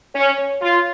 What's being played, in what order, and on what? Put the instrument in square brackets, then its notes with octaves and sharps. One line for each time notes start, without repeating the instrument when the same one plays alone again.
[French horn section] C#4 [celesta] C#5
[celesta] C#5
[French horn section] F4 [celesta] C6